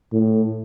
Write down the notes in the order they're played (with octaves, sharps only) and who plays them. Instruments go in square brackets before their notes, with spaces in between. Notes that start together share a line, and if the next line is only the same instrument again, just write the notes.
[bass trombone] A2